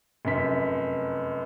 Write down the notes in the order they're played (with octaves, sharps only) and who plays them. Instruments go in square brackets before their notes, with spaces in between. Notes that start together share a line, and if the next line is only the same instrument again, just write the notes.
[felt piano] F1 F#2 B6